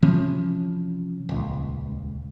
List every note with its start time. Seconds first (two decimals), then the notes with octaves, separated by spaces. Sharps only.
0.02 C3 E3 F3 C#4
1.29 D#1 C#2